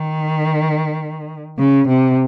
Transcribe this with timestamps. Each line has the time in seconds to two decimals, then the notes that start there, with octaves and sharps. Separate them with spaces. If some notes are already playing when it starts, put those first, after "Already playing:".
Already playing: D#3
1.58 C#3
1.89 C3